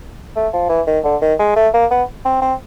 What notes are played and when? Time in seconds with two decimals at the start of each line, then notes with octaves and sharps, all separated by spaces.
0.36 A3
0.53 F3
0.69 E3
0.87 D#3
1.04 D3
1.22 D#3
1.39 G#3
1.56 A3
1.74 A#3
1.91 B3
2.25 C4
2.42 C4